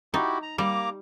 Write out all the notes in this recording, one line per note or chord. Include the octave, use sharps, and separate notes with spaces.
D#4 E4 F#4 G4
A#5
G3 A#3 A#5 D6